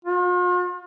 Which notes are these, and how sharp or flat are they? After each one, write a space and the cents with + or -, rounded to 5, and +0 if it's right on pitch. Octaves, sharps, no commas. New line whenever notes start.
F4 +45